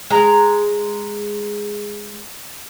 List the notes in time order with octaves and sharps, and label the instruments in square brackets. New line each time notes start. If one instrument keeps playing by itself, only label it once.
[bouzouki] G#3 A#5